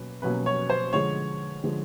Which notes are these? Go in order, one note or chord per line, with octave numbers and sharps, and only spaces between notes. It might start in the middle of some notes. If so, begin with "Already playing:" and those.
Already playing: B2 F#3 A#3 C#4 B4
B2 F#3 A#3 C#4 B4
C#5
C5
D3 F3 G#3 C#5
D3 F3 G#3